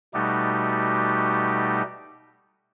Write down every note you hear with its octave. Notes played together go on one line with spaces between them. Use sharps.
B2 G3 A3 D#4 F#4 G4